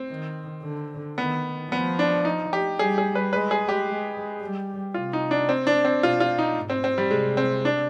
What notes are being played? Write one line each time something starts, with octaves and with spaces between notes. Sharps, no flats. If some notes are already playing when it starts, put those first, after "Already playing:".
Already playing: C4
D#3
D3
D#3 B3
F3 B3
D4
D#4
G4
G3 G#4
G#4
B4
G#3 B4
G#4
G4
G#3
G3
C3 F4
D#4
D4
C4
D4
C4
B2 F4
F4
D#4
G#2
C4
C4
G3
C3 G#3
C4
D4